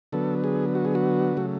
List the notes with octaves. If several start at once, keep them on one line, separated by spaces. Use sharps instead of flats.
D3 F#3 B3 A4
G#4
F#4
G#4
F#4
C#3 F#3 A3